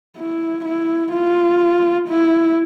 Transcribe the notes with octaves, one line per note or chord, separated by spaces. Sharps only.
E4
E4
F4
E4